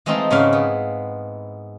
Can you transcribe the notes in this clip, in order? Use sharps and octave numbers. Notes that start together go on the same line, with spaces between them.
E3 G#3 A3 C4 D#4 F4
G#2 C#3 B3 E4 F5
B3